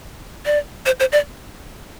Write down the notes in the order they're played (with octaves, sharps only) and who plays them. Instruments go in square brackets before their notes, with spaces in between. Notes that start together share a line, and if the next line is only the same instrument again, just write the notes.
[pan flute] D5
C5
C5
D5